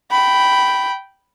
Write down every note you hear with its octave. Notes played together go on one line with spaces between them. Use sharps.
G5 B5